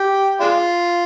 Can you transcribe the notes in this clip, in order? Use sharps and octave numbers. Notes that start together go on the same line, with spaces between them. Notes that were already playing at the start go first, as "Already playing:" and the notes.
Already playing: G4
G#3 D4 F4